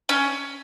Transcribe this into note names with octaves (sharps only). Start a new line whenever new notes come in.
C#4